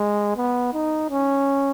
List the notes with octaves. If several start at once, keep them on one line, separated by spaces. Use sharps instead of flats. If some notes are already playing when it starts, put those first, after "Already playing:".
Already playing: G#3
B3
D#4
C#4